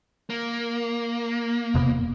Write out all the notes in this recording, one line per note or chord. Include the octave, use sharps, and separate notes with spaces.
A#3
E1 C3 B3